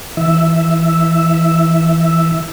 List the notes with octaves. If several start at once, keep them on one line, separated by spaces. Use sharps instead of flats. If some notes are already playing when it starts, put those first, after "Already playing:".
E3 E5